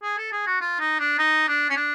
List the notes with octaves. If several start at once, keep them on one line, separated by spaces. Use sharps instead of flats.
G#4
A4
G#4
F#4
F4
D#4
D4
D#4
D4
C#4
D4